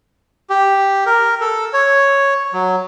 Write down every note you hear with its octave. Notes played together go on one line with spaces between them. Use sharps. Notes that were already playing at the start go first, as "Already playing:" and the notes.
G4
A#4
A4
C#5
F#3